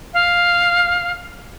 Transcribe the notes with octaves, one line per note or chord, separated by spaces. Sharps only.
F5